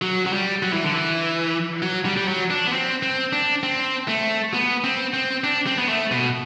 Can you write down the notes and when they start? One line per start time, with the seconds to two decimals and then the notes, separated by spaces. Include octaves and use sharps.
0.02 F#3
0.26 F#3
0.33 G3
0.63 F#3
0.73 E3
0.84 D3
0.93 E3
1.82 F#3
2.05 G3
2.17 G3
2.28 F#3
2.50 D4
2.67 B3
2.73 C4
3.03 C4
3.33 D4
3.63 C4
4.08 A3
4.54 B3
4.84 C4
5.14 C4
5.44 D4
5.67 C4
5.78 B3
5.89 A3
6.11 B2